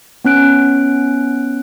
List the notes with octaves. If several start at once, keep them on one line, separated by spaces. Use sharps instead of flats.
B3 C#4 F#6 D7